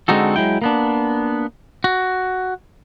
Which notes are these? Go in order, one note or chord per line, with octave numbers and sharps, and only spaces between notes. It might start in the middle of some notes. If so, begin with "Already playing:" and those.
D3 G#3 C4 D#4 F#4 A4
F#3 G#3 E4 G5
A#3 B3 D4
F#4